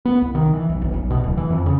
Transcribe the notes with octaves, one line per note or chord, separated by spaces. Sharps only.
B3
C2
D#3
E3
B1
G1
B1
B2
D1
E3
F2
C#3